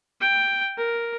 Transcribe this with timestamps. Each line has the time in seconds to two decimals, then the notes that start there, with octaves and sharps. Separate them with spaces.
0.21 G5
0.78 A#4